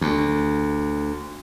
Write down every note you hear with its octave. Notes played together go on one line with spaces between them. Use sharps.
D2